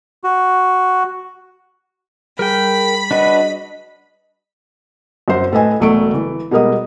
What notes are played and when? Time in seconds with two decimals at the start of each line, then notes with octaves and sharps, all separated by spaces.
0.24 F#4
2.39 G3 G#4 A#4 G5 B5
3.11 D4 F#4 B4 D#5
5.28 F#2 C5
5.52 A2 A4 B4 D#5 G#5
5.80 E1 F#3 A3 C#6 D7
6.14 E3
6.51 B2 G3 G#3 A#4 D#5 D#6